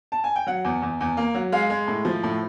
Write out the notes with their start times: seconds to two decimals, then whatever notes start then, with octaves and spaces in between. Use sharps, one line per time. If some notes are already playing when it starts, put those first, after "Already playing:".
0.12 A5
0.24 G#5
0.36 G5
0.47 F#3 F#5
0.64 E2
0.82 E2
1.00 E2
1.17 A#3
1.35 F#3
1.52 G#3 F5
1.70 G#3
1.88 A2
2.05 F3
2.23 A2